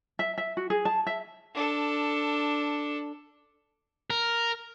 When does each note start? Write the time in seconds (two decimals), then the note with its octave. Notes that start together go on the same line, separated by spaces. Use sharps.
0.19 E5
0.38 E5
0.57 F#4
0.70 G#4
0.85 A5
1.07 E5
1.55 D4 A4
4.10 A#4